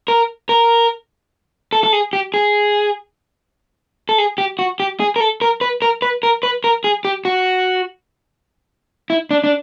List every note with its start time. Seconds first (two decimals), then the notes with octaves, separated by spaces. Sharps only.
0.08 A#4
0.49 A#4
1.73 A4
1.84 A4
1.93 G#4
2.13 G4
2.34 G#4
4.09 A4
4.18 G#4
4.38 G4
4.59 F#4
4.80 G4
5.00 G#4
5.16 A#4
5.20 A4
5.41 A#4
5.61 B4
5.82 A#4
6.02 B4
6.23 A#4
6.43 B4
6.64 A#4
6.84 G#4
7.05 G4
7.25 F#4
9.10 E4
9.31 D4
9.44 D4